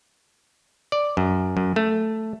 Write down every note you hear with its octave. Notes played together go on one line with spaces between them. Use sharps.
D5
F#2
F#2
A3